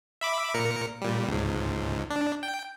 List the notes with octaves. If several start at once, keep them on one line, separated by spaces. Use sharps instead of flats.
E5 B5 D6
A#2 A#4 C#7
A#2 G3
C#2 G#2
D4
G5